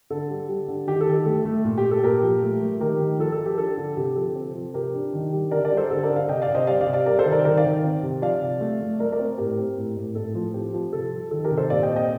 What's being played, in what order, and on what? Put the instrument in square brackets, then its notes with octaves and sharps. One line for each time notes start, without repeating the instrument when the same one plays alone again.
[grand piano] D3 A4
G3
G3
D3
D#3 G4
A4
D#3
G4
A3 A4
A3
A#2
G4
A#2
A4
A#2 G4 A#4
F3
A3
A3
D#3 G4 A#4
D#3
F3 A4
A4
F3
G4
A#4
D4 A4
D3
C3 G4
F3 A4
C4
F3
C3 G4 A#4
D4
D#3
G3
D3 A#4 D5
A#4 D5
G3
A4 C5
D3 A4
A#4 D5
D3
D5 F5
C3 D#5 G5
D5 F5
C3
C5 D#5
G3 D5 F5
D5 F5
C3
D5 F5
G3 A#4 D5
A4 C5
D#3
A#4 D5
D#3 A#4 D5
D5 F5
D#3
C4
C3
F3 D5 F5
C3
A3
A3
A3 A#4 D5
A#4 D5
C4
A2 G4 A#4
C4
A2
A2
A2 A4
F3
C4 G4
F3
C3 A4
G3
D#3 A4
G4 A#4
C3
A4 C5
A#2 D5 F5
D#5 G5
C4
D#5 G5